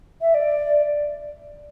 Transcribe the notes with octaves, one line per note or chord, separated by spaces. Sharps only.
E5
D5